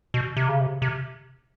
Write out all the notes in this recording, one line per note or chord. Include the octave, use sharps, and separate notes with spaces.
B2
C3
C#3
C3
C3